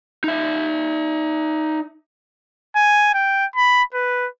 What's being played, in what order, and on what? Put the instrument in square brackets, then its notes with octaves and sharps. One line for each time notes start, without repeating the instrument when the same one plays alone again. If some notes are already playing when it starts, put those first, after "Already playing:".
[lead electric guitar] D#4 E5
[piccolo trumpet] G#5
G5
B5
B4